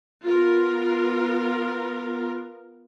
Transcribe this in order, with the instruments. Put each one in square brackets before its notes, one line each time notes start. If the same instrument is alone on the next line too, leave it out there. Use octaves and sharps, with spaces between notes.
[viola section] B3 F4 A#4